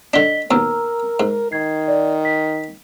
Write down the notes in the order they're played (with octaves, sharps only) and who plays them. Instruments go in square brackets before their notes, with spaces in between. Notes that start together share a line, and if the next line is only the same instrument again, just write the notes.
[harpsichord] D3 D4 [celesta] D#5 B6 G7
[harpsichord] D#2 B2 [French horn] A#4 [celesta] A#5 E6 F6
[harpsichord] G#2
[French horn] D#3 [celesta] G#6 C7
[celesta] D5
B6